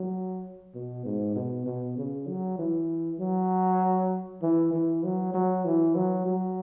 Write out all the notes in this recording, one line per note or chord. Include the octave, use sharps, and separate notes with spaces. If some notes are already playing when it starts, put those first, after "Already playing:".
Already playing: F#3
B2
G#2
B2
B2
C#3
F#3
E3
F#3
E3
E3
F#3
F#3
E3
F#3
F#3